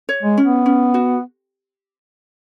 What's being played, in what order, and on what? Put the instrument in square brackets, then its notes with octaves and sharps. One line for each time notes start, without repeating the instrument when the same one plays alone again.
[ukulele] C#5
[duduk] G#3
[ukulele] C#4
[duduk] B3
[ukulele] C#4
F#4